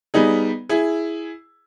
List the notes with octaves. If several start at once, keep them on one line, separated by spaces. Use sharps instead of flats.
G3 B3 D#4 G#4
E4 G#4